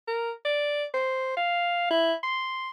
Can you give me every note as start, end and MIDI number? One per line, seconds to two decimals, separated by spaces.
0.07 0.31 70
0.45 0.84 74
0.94 1.34 72
1.37 1.90 77
1.91 2.14 64
2.23 2.70 84